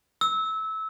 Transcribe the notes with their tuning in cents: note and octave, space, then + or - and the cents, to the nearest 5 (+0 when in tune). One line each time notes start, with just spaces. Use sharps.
E6 -20